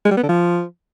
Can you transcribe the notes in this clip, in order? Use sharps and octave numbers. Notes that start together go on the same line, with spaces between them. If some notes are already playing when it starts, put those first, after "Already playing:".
G#3
G3
B3
D3
F3